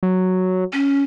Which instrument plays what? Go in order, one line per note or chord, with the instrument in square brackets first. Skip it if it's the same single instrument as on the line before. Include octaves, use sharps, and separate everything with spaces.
[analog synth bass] F#3
[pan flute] C#4